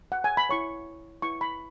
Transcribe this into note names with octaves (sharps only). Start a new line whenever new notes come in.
F#5
G#5
B5
E4 C#5 C#6
E4 B4 C#6
B5